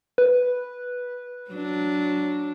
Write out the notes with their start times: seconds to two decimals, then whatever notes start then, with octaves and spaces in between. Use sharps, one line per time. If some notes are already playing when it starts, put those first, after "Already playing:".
0.18 B4
1.51 F#3 D4